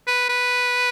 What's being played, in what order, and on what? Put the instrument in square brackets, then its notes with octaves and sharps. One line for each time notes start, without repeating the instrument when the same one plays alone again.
[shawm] B4
B4